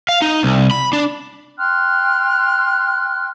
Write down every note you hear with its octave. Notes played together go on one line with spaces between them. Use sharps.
F5
D#4
C2
B5
D4
G5 C6 F6 F#6